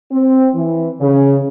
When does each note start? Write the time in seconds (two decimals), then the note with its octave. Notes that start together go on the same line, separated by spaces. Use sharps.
0.11 C4
0.54 E3
1.00 C#3